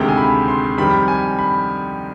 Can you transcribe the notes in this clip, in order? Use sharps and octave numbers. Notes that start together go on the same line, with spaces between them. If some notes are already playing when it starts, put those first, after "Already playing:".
Already playing: D2 C3 D#3 G#3 G5
G#5
B5
C6
F2 D#3 G3 B5
G#5
B5